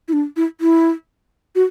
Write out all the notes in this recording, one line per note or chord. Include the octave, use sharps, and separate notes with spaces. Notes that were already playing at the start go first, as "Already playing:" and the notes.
E4
D4
E4
E4
F#4